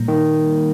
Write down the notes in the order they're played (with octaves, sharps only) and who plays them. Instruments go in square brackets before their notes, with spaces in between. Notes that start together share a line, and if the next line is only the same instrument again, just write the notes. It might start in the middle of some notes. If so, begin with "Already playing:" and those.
Already playing: [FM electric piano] A#2 G3 A#3
[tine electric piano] D#3